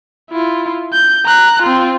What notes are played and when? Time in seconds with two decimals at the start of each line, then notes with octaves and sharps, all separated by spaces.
0.31 E4 F4
0.93 G6
1.25 A#5 F#6
1.63 C4 F4